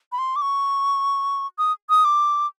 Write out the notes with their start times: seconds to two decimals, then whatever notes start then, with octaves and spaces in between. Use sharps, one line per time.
0.12 B5
0.18 C6
0.36 D6
0.42 C#6
1.58 D#6
1.90 D#6
2.05 D6